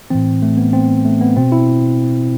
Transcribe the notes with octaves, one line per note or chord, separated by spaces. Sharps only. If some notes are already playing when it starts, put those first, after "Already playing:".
A2 E3 C4
A3
B3
C4
A3
B3
B2 C4
E4